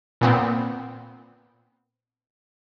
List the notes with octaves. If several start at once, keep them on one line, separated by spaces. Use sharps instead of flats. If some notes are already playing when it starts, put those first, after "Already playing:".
A#2 B3 C4